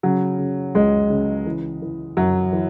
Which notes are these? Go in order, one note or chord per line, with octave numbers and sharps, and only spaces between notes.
C#3 F#3
C#3
C#2 G#3
C#3
E3
E3
F#2 F#3
E3